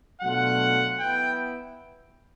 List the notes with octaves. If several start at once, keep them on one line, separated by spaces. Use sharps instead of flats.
B2 F#3 A3 D4 F4 F#5
B3 E4 G5